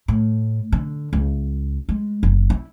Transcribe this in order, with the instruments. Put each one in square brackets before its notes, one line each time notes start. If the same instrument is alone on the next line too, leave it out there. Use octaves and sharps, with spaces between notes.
[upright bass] A2
D3
C#2
G#3
F#1
E4